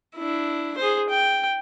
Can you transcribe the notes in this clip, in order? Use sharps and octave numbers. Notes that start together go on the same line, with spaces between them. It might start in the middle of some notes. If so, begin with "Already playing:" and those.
D4 E4
G#4 C5
G5